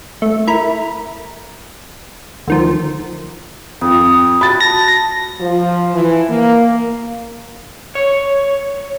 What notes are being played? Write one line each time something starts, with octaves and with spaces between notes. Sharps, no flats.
A3
E4 A#4 B5
D2 D#3 F3
F2 D#6
F#4 B5 A6
A5 A#6
F3
E3
A#3
C#5